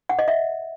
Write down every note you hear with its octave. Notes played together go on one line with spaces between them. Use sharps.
F#5
D#5
E5